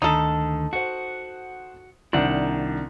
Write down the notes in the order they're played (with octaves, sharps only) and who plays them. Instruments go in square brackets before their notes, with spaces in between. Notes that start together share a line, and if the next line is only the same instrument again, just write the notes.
[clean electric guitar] D2 D3 D#3 [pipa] D#4 A4 [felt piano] D#6
[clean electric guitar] F#4 [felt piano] C5 F#5
[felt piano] C2 D#3 D5 [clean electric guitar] C4 D4 F#5